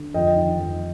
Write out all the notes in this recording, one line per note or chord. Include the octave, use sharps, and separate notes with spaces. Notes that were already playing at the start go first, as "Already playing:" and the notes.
Already playing: D3
F2 D#5 G5
D#3
F2